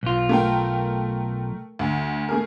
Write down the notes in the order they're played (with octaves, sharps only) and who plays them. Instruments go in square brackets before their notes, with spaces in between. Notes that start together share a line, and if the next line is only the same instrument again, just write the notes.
[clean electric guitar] B1 F4
[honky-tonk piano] A3 A#4 G5
D2
A3 G#4 A#4